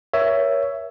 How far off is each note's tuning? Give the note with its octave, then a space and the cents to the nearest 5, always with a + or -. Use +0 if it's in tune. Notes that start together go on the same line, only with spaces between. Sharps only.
A#4 +35 C#5 +10 E5 +10